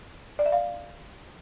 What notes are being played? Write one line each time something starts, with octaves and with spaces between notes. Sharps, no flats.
D5
E5
F5